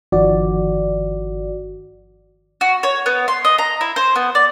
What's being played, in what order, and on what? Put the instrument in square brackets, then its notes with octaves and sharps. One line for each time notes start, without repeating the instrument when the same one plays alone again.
[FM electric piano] G1 D#3 F3 F#4 D5
[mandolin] F#4
C#5
B3
C6
D#5
A#5
E4
C5
B3
D5